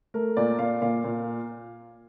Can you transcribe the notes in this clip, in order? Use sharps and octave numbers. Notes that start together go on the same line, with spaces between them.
A3 A#4
A#2 D5
A#2 F5
A#2 F5
A#2